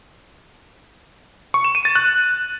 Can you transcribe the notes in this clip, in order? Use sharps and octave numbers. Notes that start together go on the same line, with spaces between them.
C#6
E7
D#7
A6
F#6